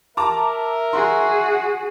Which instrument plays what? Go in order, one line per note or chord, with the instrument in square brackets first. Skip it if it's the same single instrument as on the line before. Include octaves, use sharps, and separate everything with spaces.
[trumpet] A#4 [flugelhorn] E5 [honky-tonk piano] A5 A#5 D6
[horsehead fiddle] F#4 G#4 [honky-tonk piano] C6